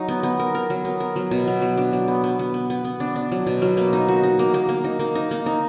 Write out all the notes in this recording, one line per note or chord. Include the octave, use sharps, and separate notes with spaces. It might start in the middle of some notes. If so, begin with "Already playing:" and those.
Already playing: F#3 D#4
B3
B3
A#4
A#4
F#3
B3
A#4
F#3
B2
F#3
F#3
D4
F#3
B3
B3
B3
B3
B3
B3
D4
D4
F#3
B2
F#3
A#3
D#4
F#4
D#4
A#3
A#3
A#3
D#4
A#3
D#4
A#3
D#4